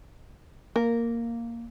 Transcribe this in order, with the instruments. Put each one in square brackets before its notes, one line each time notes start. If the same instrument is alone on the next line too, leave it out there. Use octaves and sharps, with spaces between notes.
[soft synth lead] A#3 [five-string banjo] A#4